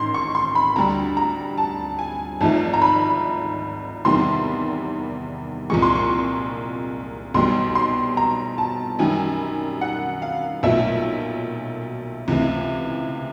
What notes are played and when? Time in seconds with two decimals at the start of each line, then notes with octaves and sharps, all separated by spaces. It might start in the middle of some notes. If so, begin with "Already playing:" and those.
Already playing: A1 G#2 D#3 C6
0.14 C#6
0.35 C6
0.55 B5
0.76 D2 D3 G3 A#5
1.17 A#5
1.58 A5
1.99 G#5
2.41 G#1 G#2 F3 A3 A5
2.74 A#5
2.82 B5
4.05 E2 C3 D#3 G3 C6
5.70 C2 A#2 F3 G#3 C#6
5.82 C6
5.96 C#6
7.34 B1 B2 G3 C6
7.75 C6
8.17 A#5
8.58 A5
8.99 F#2 D#3 G3 G#5
9.81 F#5
10.22 F5
10.63 B1 A#2 F#3 A3 E5
12.28 C#2 C3 E3 A3